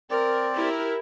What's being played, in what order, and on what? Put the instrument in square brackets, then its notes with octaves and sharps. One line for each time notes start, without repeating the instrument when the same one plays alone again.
[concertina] C4 D5 [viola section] A#4
[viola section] E4 G4 A#4